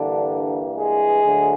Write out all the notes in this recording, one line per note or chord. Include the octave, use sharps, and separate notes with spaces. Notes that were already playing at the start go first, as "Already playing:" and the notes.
Already playing: G2 D3 E3 G3 A#3 D4
G#3 G#4
D2 D3 F#3